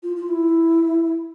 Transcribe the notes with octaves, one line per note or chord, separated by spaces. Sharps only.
F4
F4
E4